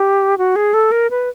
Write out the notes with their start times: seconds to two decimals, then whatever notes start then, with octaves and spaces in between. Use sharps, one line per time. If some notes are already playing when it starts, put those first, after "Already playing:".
Already playing: G4
0.38 F#4
0.56 G#4
0.74 A4
0.91 A#4
1.10 B4